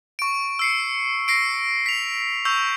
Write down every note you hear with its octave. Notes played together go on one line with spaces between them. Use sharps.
C#6 D7
E6 C7 C#7
A#6 C7 D7
B6 F7
C#6 E6 G6 F7